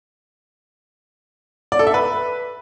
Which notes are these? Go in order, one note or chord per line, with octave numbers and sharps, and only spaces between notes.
D5
A4
E5
B4